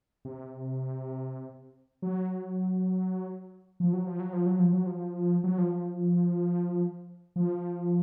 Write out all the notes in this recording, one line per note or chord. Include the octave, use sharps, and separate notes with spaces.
C3
F#3
F3
F#3
F3
F#3
F3
F#3
F3
F#3
F3
F#3
F3
F3